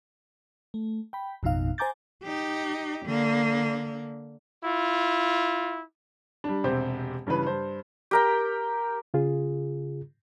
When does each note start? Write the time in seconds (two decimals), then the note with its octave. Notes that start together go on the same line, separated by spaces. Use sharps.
0.74 A3
1.13 G5 B5
1.43 A1 F2 B2 D#4 F5
1.78 C5 G#5 A#5 D6 G6 A6
2.24 D#4 G4
3.06 D3 A#3
4.64 E4 F4
6.44 G3 D4
6.64 E1 C3 C4 G4 C5
7.27 G2 C#3 E3 B4
7.46 G2 C5
8.11 G4 A#4 G5
9.14 C#3 F4 G#4